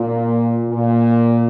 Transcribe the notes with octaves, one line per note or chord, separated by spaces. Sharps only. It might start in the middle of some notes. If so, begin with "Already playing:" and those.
Already playing: A#2
A#2